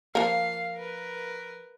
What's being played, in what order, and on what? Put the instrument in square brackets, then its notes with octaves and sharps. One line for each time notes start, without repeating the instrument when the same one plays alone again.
[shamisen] F3 A#3 [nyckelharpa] F5
[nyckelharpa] A#4 B4